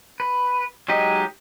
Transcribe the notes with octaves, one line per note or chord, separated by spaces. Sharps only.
B4
F#3 G#3 D#4 G4 D#5